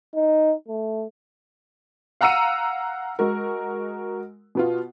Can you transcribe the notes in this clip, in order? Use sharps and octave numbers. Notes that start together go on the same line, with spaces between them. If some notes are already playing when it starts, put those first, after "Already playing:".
D#4
A3
F5 F#5 A#5 E6 C#7 D#7
G#3 F#4 A#4
B2 B3 F4